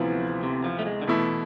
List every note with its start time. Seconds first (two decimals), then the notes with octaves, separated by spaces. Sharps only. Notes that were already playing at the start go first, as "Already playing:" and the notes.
Already playing: D2 C3 E3 F3 B3 E4
0.43 C3
0.64 F3
0.79 A3
0.86 G#3
1.02 D3
1.07 B2 E3 A3 E4